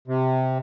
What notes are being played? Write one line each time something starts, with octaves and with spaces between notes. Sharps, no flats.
C3